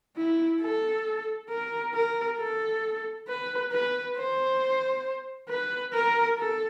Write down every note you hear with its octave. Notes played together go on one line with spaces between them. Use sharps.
E4
A4
A#4
A#4
A4
B4
B4
C5
B4
A#4
A4